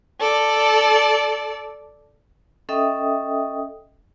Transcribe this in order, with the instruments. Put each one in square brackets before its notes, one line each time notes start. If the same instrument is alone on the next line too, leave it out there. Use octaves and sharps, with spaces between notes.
[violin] A4 D5
[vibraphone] C#4 A4 D#5 E5 G5 D#6